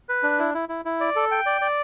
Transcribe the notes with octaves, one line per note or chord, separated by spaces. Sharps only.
B4
D4
E4
E4
E4
E4
D5
A4
G5
D5
D5